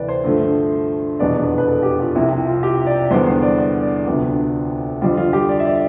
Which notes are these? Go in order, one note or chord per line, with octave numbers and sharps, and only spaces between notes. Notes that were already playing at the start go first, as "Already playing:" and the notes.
Already playing: D2 C3 E3 B4 D5
C5
G2 D3 F3 A3
F1 E2 B2 B3 D4 D5
B4
B4
A4
G4
F4
C2 C3 F3 E4
E4
F4
G4
D5
E2 D3 G3 B3 D4 C5
C5
D5
D5
D5
D2 C3 F3 B3 D4
F2 D3 G3 F4
F4
G4
D5
E5
D5